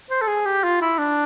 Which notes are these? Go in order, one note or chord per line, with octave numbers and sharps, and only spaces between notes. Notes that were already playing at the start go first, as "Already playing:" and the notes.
C5
A4
G#4
G4
F4
E4
D4